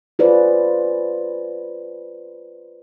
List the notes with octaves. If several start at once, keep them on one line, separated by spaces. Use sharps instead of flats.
F4 G#4 B4 C5 D5